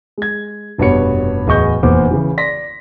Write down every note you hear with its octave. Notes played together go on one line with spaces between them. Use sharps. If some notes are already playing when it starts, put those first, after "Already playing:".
G#3 G#6
F1 G2 B2 B3 C#5 C#7
D1 E2 G#4 D#5 C#6 G6
F1 E2 A#2 C5 D6
C#3 E3
D5 C6 A#6 B6